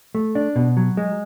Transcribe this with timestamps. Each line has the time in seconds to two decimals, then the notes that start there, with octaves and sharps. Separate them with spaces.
0.15 A3
0.35 D4
0.56 B2
0.77 F#3
0.97 G#3